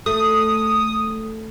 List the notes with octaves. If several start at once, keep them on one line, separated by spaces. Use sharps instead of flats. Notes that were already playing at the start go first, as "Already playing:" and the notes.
A3 D#6